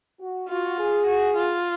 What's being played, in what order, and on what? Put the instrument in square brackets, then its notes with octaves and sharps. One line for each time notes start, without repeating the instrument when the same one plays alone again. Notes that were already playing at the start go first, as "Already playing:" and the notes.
[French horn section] F#4
[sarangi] F4 [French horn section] F#4
[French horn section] G#4
[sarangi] F#4
F4